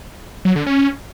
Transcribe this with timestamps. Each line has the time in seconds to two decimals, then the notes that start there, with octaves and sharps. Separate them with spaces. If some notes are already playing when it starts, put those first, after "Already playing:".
0.45 F#3
0.56 D3
0.66 C#4